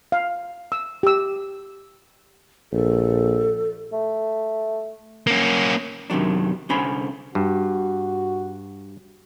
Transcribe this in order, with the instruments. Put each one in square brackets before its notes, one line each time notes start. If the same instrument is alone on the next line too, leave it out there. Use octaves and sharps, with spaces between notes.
[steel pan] F5
E6
G4 E6
[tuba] A#1 [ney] A4
[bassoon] A3
[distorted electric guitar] A#3 C#4
[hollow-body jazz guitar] F#2 C3 D#3 F#3 D4
C2 D3 C#4 C5 B5
[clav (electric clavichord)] G2 [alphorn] F#4